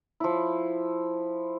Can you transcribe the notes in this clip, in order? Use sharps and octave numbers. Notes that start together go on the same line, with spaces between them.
F3 E4